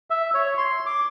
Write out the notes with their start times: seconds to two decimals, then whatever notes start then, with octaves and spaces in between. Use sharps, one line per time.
0.10 E5
0.34 C#5
0.57 C6
0.86 D6